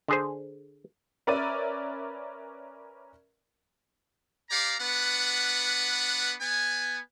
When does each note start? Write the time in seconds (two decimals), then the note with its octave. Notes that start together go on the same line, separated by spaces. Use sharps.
0.08 D3 G#4 C5
1.27 C#4 A#4 B4 D5 E5 D#7
4.50 G4 D5 F5 A#5
4.80 B3 D4 B4 F#5
6.41 B3 G#5